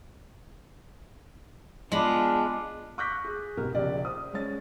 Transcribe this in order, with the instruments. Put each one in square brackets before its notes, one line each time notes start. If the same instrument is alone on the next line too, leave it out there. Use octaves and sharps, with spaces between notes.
[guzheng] G#3 B5 [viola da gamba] B3 F4 [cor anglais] D4
[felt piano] C#6 D6 F#6 G6 A#6 B6
G#4
G#2 B2 G4 A#4
A#1 C#3 G4 D5
C5 D#6
G#3 C#4 A6